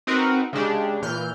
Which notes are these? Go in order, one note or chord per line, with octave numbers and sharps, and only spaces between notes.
C4 D#4 F#4 A#4 B4
C#3 G#3 D4 G4
A#2 E3 F6 G6